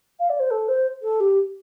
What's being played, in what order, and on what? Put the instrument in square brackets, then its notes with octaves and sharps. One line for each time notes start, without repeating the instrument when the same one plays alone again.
[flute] F5
D5
C5
A4
C5
A4
G4